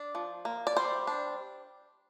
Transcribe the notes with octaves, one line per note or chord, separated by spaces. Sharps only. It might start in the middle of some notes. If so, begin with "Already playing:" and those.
Already playing: D4 D5
F3
A#3
D5
G3 C5
D4